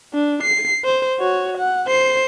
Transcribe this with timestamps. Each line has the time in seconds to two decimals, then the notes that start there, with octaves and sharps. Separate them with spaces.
0.14 D4
0.43 C7
0.85 C5
1.20 F#4 C#5
1.58 F#5
1.88 C5 C7